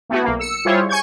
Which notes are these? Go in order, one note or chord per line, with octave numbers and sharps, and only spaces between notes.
A3 B3 E4 F#4
B1 A#3
E6 C#7
G3 E4 F4 G#4 C5 C#5
G#5 C#6 G6 G#6